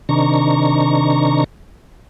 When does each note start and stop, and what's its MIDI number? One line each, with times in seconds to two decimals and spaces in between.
0.09 1.44 48
0.09 1.44 51
0.09 1.44 62
0.09 1.44 82
0.09 1.44 85